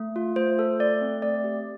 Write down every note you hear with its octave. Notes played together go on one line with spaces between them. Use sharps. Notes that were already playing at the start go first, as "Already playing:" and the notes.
Already playing: A3
F4
A3 C5
A4
A3 D5
C4
A3 D5
G4